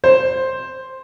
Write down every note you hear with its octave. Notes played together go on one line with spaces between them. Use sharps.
C5